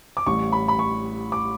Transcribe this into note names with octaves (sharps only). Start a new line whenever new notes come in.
D6
A1 A2 G3 C#6
B5
B5
C#6
D6